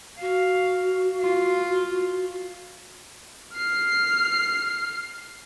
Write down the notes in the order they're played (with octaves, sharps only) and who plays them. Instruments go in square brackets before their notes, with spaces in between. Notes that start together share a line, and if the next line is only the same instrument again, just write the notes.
[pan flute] F#4 [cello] F5
[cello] F4
[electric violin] F6 C7